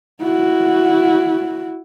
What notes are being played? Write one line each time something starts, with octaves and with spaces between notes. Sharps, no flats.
E4 F#4